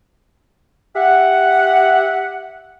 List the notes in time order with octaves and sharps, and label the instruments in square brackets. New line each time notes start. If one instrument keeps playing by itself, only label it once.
[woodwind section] G4 E5 F#5